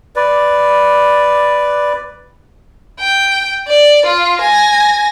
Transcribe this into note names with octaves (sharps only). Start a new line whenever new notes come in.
B4 D5
G5
D5
F4
G#5 A#6